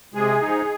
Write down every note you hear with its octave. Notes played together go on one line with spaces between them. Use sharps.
C3 G#3 G#4
F3 G#3 D#4